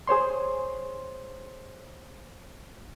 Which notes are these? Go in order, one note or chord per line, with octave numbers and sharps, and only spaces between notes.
G#4 C5 C#5 C6